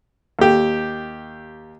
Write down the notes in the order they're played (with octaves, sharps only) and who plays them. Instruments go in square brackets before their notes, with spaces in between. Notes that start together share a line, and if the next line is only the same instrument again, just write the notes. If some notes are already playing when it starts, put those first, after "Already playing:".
[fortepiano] D#2 G4